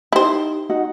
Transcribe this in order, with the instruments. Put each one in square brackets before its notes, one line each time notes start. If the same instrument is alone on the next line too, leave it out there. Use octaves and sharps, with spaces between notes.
[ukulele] D#4 G4 [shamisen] E4 C5
[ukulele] D#4 F#4 F#5